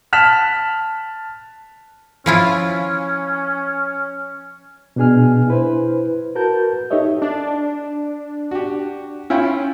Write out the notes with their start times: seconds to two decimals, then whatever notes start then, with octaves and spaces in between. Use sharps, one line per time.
0.13 A5 F6 F#6 B6 E7
2.26 F3 C#4 E4 F4
4.96 B2 B3 D4 G#4 G#5 F6
5.48 E4 B4 C5
6.35 F#4 A#4 B4 A5 G6
6.90 D#4 G4 A4 C#5 D#5 E5
7.22 D4
8.51 F#4 G4
9.30 C#4 E4 F4 G5